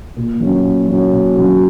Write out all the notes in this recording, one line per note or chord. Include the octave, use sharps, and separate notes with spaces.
A#2
F#3 C#4 F#4
A#2
F#3 C#4 F#4
A#2
F#3 C#4 F#4